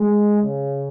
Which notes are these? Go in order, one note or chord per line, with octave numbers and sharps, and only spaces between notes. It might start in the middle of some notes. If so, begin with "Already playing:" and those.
Already playing: G#3
C#3